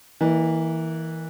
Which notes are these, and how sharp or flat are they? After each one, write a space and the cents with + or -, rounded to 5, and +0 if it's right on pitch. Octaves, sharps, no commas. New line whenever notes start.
E3 -20 A#3 +0 D#5 -45